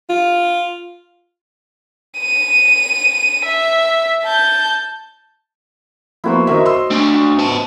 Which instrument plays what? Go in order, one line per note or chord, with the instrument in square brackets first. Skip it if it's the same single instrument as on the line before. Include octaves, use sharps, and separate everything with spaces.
[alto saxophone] F4
[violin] D#7
E5
A5 G6
[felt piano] F3 A#3 B3 [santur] E4 F#4 C5
[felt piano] D#3 A#4 E5 [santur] F#3 D#5
[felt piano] C6 E6
[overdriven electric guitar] A3 D4
[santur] F#4
[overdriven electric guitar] B3 A5